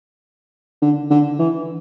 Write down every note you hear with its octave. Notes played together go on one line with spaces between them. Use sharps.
D3
D3
E3